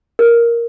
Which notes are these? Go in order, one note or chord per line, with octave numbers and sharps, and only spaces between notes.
A#4